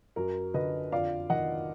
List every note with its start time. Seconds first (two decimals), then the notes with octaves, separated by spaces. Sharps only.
0.16 F#2 A#4
0.54 D3 B4 D#5
0.92 F2 D5 F5
1.30 D#3 D#5 F#5